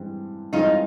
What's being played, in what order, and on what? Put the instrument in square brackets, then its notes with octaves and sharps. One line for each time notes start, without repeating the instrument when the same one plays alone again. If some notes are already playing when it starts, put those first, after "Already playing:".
Already playing: [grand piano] G2 E3 G#3 C4
[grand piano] G2 E3 G#3 C4 [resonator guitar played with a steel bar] D#4 F4